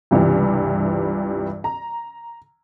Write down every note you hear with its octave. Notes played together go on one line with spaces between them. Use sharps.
C#2 G2 C3 E3
A#5